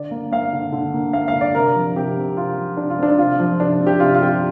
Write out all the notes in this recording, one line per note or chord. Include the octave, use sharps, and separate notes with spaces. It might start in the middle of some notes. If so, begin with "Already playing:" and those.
Already playing: D3 D5
A#3
A#3 F5
D3
D3
A#3
A#3 F5
F5
D3
D5
C3 A#4
F3
C3 G4
C4
C3 F4
F3
C3 D4
F4
C4 D4
D4
C3 F4
F3
C3 D4
C4
G4
C3 F4
F4
F3 G4
F4